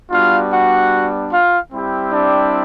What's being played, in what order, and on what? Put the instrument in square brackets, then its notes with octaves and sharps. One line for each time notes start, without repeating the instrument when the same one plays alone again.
[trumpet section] G3 B3 D4 F4 F#4 F5
F#4 F#5
F4 F5
G3 C4 E4 G4
D4 D5